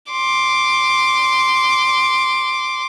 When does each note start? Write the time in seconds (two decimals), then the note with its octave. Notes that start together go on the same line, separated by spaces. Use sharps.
0.11 C6 D6